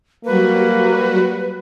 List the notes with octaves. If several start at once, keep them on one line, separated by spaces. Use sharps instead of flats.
F#3 G3 A#3 F#4 B4